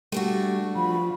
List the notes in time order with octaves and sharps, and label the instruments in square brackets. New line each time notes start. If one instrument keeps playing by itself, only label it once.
[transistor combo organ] G3 [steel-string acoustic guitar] A3 D4 F#4
[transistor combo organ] F3 [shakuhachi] B5